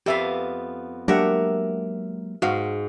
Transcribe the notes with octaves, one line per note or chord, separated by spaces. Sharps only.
F2 B3 G4 E5 F5
F#3 G#3 A#3 D4 G4 A#4 E5 F#5
G#2 F#4 F5